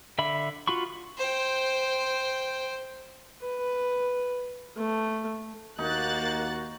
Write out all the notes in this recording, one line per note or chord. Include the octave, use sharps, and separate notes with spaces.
D3 E5 B5
F4 F#4 B5 C#6
C5 G5
B4
A3
D#2 A#3 D#4 F#4 F#6 A6